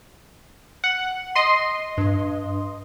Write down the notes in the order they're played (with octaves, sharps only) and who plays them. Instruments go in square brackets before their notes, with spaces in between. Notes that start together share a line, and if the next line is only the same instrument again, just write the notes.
[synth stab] F#5
D#5 C6
[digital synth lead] G2